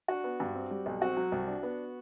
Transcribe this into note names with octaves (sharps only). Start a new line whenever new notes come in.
D4 F#4
B3
G2
C4
G3
B1
C4 F#4
F#3
C2
D4
B3